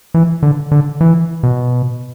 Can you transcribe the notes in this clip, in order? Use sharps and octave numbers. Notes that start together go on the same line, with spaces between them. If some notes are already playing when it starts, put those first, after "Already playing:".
E3
D3
D3
E3
B2